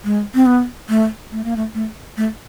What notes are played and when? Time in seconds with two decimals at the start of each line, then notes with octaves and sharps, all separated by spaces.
0.04 G#3
0.35 C4
0.46 B3
0.89 A3
1.32 A3
1.44 A#3
1.57 A3
1.74 A3
2.17 A3